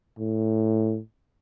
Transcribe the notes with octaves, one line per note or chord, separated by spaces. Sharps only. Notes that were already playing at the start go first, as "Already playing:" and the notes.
A2